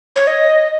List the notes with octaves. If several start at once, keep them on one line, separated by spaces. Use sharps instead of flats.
C#5
D#5